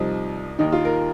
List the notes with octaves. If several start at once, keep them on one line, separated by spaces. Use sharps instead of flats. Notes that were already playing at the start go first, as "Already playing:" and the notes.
Already playing: C2 C3 F3 D#4
D#2 D#3 D#4
F4
A#4